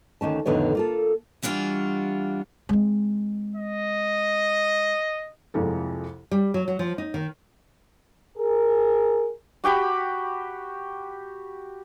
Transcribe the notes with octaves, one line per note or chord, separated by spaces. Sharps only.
D2 D#3 C#4 A5
F2 A2 D3 D#3 B3 C#5
A#3 F4 A4
E3 G3 D4 F4 F#4
G#3 C4
D#5
C2 F2 F3 G#3 A4
G3
F#3
F#3
F3
D#4
D#3
G#4 A#4
F#4 G4 G5 B5